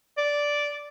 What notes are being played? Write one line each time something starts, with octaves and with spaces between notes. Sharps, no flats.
D5